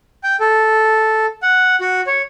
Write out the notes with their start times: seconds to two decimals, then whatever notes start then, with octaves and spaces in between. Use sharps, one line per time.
0.24 G5
0.40 A4
1.42 F#5
1.81 F#4
2.07 C#5